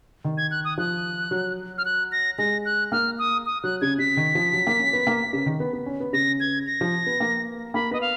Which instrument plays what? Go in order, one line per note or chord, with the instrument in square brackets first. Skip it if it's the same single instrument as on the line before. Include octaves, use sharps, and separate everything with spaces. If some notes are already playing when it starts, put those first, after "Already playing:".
[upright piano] D#3
[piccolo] G#6
F#6
D#6
[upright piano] F3 [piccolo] F#6
[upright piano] F#3
[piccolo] F6
F#6
A#6
[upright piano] G#3 [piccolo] A#6
[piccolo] F#6
[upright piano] A#3 [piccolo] F6
[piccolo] D#6
D#6
[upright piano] F#3 [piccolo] F#6
[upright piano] C#3 [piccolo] G#6
[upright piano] C#3 [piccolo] B6
[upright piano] D#3
F3
F#3
A#3
C#4
B3
A#3
C#3
D#3
B3
B3
C#4
B3
[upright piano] C#3 [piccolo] A#6
[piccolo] G#6
A#6
[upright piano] F3
B3
A#3
[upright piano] A#3 [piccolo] B5
[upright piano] B3 [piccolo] D#5
[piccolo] F5